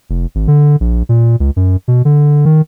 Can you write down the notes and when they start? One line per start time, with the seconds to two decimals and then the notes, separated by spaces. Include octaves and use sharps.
0.10 F1
0.35 G#1
0.48 D3
0.80 A#1
1.09 A#2
1.40 C#2
1.56 F#2
1.88 B2
2.05 D3
2.45 D#3